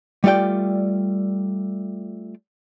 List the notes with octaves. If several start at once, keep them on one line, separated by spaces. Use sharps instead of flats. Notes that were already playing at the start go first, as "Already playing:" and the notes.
G3 A3 F4 D5 G5